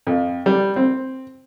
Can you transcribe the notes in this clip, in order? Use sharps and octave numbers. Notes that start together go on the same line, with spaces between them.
F2
G3
C4